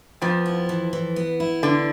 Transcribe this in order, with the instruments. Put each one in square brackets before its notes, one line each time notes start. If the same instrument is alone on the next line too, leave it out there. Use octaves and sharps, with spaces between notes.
[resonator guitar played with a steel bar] F2 F3 [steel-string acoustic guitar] B3
[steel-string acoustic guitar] E4
E3
E3
B3
E4
[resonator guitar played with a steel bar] D3 [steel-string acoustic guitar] B3